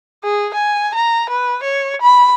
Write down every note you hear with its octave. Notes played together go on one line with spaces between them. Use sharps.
G#4
G#5
A#5
B4
C#5
B5